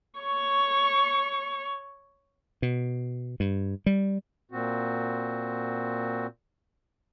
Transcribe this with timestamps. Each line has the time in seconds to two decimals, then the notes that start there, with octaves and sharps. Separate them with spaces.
0.20 C#5 C#6
2.62 B2
3.40 G2
3.86 G3
4.51 A#2 C4 F#4